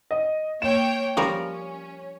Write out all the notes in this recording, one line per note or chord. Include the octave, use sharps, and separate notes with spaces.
D#5
A#3 C#5 G5 E7
F3 G3 C#4 A#4 C#6